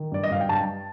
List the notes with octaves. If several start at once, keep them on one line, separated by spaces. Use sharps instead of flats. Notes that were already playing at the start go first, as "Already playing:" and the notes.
Already playing: D#3
G2 D5
D#5
G2 F5
G5
G2 A5